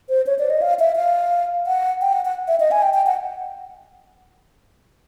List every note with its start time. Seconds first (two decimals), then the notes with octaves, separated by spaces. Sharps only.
0.09 C5
0.27 C#5
0.39 D5
0.50 D#5
0.62 F5
0.79 E5
0.96 F5
1.67 F#5
2.01 G5
2.13 F#5
2.25 F#5
2.48 E5
2.60 D#5
2.71 G#5
2.82 G5
2.94 G5
3.06 F#5